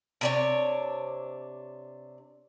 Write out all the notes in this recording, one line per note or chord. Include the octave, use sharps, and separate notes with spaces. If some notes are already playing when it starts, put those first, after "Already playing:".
C3 D4 C#5